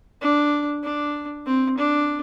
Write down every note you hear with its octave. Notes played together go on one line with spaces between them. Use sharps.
D4
D4
C4
D4